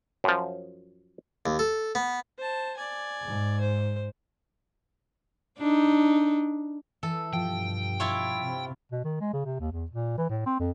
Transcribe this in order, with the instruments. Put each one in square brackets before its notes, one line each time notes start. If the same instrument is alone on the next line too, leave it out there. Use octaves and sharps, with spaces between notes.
[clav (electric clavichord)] F#2 F3
[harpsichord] D#2
A4
B3
[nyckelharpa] C5 A5
D5 G#5
[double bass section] G#2
[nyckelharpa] C5
[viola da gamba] D4 D#4
[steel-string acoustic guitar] E3 [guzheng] A4
[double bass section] G2 B2 [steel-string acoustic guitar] F3 [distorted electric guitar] G5
[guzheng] E4 F4 C#5
[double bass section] C3
[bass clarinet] B2
D#3
G#3
C#3
C3
D#2
E2
A#2
E3
A2
C4
F2